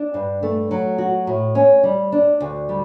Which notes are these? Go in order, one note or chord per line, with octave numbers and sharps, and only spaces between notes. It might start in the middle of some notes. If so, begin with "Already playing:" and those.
Already playing: D4
G2
A3
F#3
F#4
A2
C#4
G3
D4
D2
G3